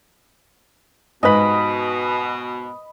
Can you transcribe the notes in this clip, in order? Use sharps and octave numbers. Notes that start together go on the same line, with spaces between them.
G#2 B2 B4 D#5 B5